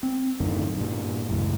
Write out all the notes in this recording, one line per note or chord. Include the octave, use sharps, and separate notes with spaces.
C4
F#2 A2 D3 D#3
G2 A#2
C#2 F#2 A2